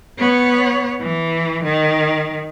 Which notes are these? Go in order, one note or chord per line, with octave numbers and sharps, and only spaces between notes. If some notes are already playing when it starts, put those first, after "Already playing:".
B3 C#5
E3
D#3